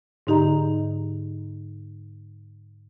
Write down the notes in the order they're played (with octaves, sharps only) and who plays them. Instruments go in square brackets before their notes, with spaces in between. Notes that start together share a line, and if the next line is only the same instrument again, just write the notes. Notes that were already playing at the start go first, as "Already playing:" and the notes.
[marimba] G#2 D3 D#4 G4 D#5 A#5